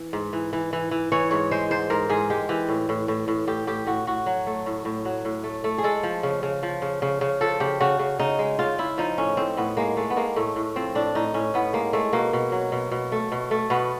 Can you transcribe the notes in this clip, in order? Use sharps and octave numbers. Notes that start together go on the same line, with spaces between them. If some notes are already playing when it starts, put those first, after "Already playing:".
Already playing: E3
G#2
E3
E3
E3
E3
E3 C#5
G#2 C#5
G#3 C5
G#2 C5
G#2 A#4
G#2 G#4
G#3 G4
E3 G4
A2
A2
A2
A2
A2 G4
A2 G4
A2 F#4
A2 F#4
F#3
A3
A2
A2
F#3
A2
A3
A3
G#4
G#3 A4
F3
C#3
C#3
F3
C#3
C#3
C#3
F3 A4
C#3 G4
C#3 F#4
C#3
C#3 D#4
G#3
C#3 F4
C#3 E4
F3 D#4
A2 C#4
A2 C4
A2 B3
G#3 A#3
G#3 A3
B3
G#3 A#3
A2 A3
A2
F3 C4
A2 D4
A2 D#4
A2 C#4
A2 B3
G#3 A#3
G#3 A3
B2 A#3
B2
F#3
B2
B2
A3
B2
A3
B2 B3